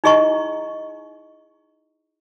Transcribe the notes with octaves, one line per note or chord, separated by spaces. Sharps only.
D#4 E4 G#4 D#5 A#5 C#6